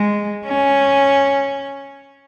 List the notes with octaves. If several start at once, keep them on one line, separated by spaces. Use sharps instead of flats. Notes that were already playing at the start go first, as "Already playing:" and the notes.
Already playing: G#3
C#4